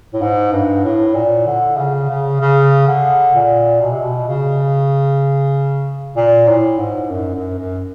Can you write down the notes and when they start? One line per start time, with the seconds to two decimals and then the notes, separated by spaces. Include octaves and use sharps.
0.14 A2
0.22 G#2
0.52 G2
0.84 A2
1.15 A#2
1.47 D3
1.77 C#3
2.09 C#3
2.41 C#3
2.88 D3
3.35 A#2
3.81 B2
3.92 C3
4.02 B2
4.28 C#3
6.17 A#2
6.48 A2
6.79 G#2
7.10 F#2
7.35 F#2
7.58 F#2